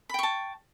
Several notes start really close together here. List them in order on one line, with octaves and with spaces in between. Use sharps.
B5 G5 C#6 A5